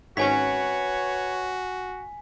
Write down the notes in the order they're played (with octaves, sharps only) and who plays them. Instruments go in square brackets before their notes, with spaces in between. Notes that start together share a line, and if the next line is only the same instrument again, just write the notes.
[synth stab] G#1 C#4 [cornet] F#4 [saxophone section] B4 C#5 [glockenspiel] G#5 B6